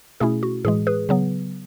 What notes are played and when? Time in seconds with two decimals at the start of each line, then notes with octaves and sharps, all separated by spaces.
0.20 B2 A3 C#4 E4 G#4
0.43 F#4
0.65 A2 E3 G#3 G#4
0.87 G#4 B4
1.09 C#3 F#3 B3